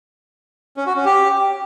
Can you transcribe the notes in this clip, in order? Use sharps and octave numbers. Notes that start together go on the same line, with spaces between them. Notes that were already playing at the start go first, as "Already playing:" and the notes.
C#4
F#4
C#4
G4